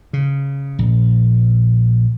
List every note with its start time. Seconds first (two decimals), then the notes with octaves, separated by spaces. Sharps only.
0.13 C#3
0.79 A#1